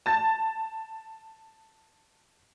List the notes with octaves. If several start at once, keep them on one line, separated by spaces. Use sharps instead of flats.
A5 A6